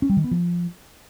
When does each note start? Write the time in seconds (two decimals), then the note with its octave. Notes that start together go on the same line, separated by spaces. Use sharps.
0.02 C#4
0.10 G3
0.17 D#3
0.24 B3
0.31 F3